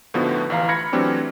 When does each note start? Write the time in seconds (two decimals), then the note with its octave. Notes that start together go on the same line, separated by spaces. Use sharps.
0.14 A2 D3 F3 B3 D#4 F#4
0.50 A1 E3 F5 A#5
0.68 B5 F6 G#6 A#6 C#7
0.92 E3 F#3 A3 C4 D4 G4